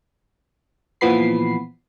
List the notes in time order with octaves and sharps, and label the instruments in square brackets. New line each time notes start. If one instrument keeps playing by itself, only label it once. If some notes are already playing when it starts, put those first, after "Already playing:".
[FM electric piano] A#2 E3 F3 B3 B5 C7